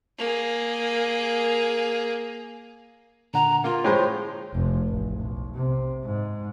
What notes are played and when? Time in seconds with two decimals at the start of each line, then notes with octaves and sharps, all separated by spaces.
0.18 A#3 G#4
3.34 A#2 D3 F#5 A#5
3.64 A#3 F4
3.84 A2 G#3 C5 C#5 G5
4.54 F1
4.88 A1
5.19 B1
5.54 C3
6.04 G#2